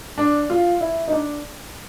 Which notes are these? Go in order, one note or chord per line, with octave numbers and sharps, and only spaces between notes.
D4
F4
E4
D#4
D4